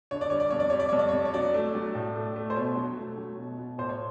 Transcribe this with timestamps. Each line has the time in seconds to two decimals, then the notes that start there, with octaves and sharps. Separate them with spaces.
0.11 D3 C#5
0.21 D5
0.30 G3 C#5
0.40 D5
0.51 F2 C#5
0.60 D5
0.70 G3 C#5
0.80 D5
0.89 F2 C#5
0.99 D5
1.09 F2 C#5
1.25 C#5
1.34 F#3 D5
1.54 A3
1.75 F#3
1.95 A2
2.15 A3
2.36 A3
2.50 C5
2.56 B2 C#5
2.76 F#3
2.97 A3
3.18 F#3
3.38 B2
3.58 B2
3.78 A2 C5
3.89 C#5